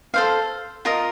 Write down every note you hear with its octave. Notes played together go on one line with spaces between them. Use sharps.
A4 C5 F5
F4 A#4 D#5